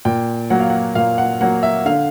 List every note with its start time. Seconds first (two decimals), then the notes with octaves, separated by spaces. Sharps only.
0.05 A#2 G5
0.50 F#3 A#3 F#5
0.60 F5
0.70 F#5
0.95 A#2 F5
1.18 F#5
1.41 F#3 A#3 F#5
1.63 E5
1.86 D3 F5